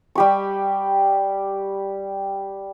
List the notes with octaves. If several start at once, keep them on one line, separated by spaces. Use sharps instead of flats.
G3 G4 C#6